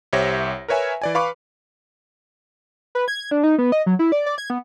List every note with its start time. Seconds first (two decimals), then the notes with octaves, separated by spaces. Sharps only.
0.13 C2 G4 C5 C#5 E5 A#6
0.68 A#4 B4 C#5 E5 G#5
1.02 E3 D5 G#5
1.15 B4 F5 B5 C#6 D6
2.95 B4
3.08 G#6
3.31 D4
3.43 D#4
3.58 B3
3.72 D#5
3.86 F#3
3.99 E4
4.12 D5
4.26 D5
4.38 G#6
4.50 B3